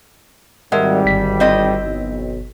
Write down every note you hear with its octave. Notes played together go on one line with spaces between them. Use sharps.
G#1 G3 G#3 A#4 E5 F#5
G1 B6
C4 E4 D#5
B1